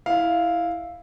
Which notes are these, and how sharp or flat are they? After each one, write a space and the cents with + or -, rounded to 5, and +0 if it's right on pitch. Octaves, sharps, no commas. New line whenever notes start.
E4 -5 F5 +0